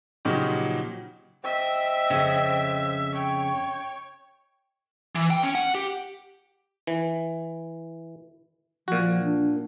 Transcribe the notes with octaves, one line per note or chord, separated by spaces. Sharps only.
A#2 C#3 F3 F#3 D#4 G4
C4 D#5 E5
F2 C#3
C#5 G5
E3
G5
C#4
F#5
G4
E3
A#2 F3 F#4
D4